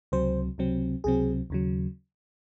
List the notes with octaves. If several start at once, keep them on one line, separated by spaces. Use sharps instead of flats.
C#2 C3 F#3 C4 C5
C#2 C3 F#3 C4
C#2 C3 F#3 C4 G#4
D#2 C#3 F#3